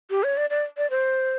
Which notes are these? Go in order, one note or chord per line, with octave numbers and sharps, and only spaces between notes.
G4
C#5
D5
D5
D5
C5